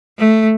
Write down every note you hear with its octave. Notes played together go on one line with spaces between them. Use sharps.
A3